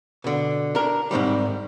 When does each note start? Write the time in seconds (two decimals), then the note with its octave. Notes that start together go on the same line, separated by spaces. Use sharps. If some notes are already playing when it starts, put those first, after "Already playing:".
0.24 B2 D3
0.75 D4 A#4
1.11 G#2 C3 D#3 G3